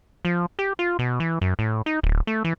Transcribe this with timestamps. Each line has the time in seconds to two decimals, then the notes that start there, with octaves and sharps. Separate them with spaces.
0.25 F3
0.59 G4
0.79 F4
0.99 B2
1.20 E3
1.41 F#2
1.59 A2
1.86 D#4
2.03 D1
2.27 A3
2.44 E3